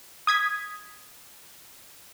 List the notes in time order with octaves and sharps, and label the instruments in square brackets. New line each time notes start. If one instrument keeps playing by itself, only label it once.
[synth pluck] D#6 G#6 B6